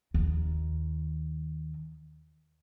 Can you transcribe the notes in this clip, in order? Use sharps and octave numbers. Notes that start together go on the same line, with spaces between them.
D#2 D#3